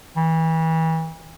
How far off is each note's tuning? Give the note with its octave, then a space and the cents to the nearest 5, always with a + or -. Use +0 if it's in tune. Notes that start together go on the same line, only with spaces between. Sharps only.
E3 -30